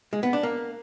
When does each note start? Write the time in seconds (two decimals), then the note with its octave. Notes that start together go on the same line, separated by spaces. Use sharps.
0.13 G#3
0.23 B3
0.33 D4
0.43 A#3